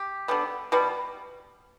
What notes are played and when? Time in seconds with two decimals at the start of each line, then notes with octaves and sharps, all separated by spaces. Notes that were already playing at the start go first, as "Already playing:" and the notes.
Already playing: G4
0.28 D3 G3 B3
0.72 B2 G3 B3